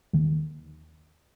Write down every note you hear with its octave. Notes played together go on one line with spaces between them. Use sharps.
D#2